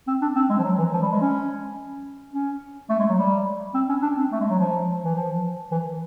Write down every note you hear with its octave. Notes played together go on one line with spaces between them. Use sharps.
C4
D4
C4
G#3
F3
F#3
E3
F3
G3
G#3
C#4
C#4
A3
G#3
F#3
G3
C4
C#4
D4
C#4
C4
A3
G#3
F#3
F3
E3
F3
E3